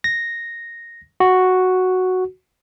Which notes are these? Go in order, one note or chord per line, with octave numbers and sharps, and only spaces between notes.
A#6
F#4